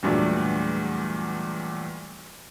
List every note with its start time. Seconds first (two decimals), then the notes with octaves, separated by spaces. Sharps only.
0.03 E2 G2 A#2 F#3 A3 D4